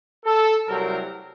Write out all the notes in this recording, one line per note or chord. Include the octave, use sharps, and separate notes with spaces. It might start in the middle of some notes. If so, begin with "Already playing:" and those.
A4
C2 C3 F#3 A3 C4 A#4